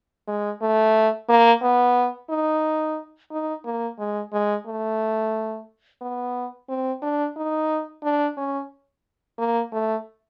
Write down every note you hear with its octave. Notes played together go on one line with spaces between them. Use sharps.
G#3
A3
A#3
B3
D#4
D#4
A#3
G#3
G#3
A3
B3
C4
D4
D#4
D4
C#4
A#3
A3